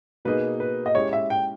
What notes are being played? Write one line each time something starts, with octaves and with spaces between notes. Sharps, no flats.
B2 A#3 D#4 G#4 B4
B4
D#5
G#3 C#4 E4 G4 C#5
E5
G5